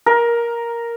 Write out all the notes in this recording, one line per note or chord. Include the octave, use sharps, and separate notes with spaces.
A#4